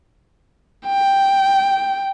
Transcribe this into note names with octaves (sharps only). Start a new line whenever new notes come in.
G5